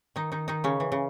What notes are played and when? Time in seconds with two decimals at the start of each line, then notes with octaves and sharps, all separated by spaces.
0.16 D#3 D#4
0.32 D#3 D#4
0.48 D#3 D#4
0.64 C#3 C#4
0.80 E3
0.92 C#3